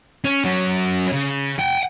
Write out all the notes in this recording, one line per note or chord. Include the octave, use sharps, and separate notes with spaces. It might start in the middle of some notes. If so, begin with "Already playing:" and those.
C#4
F#3 C#4
C#3
F#5 G5